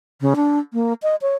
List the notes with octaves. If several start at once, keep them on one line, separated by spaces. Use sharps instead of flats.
C#3
D4
A#3
D#5
C#5